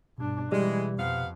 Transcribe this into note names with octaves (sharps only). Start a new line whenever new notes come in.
G2 B2 D4
E3 G3 G#3
F2 C3 B3 F5